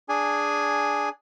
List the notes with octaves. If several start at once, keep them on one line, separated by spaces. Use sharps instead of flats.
D4 G#4 G#5